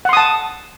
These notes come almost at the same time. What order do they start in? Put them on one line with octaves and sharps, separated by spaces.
F#5 C6 D#6 A5